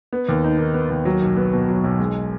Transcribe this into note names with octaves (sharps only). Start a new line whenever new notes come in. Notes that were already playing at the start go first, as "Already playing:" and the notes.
B3
D#2
D#4
D#3
B3
D#2
F#3
B1
B3
B2
F#3
B1
G#3